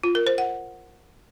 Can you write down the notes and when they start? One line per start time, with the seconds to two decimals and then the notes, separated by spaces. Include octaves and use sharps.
0.03 F4
0.15 A#4
0.27 C5
0.38 F#5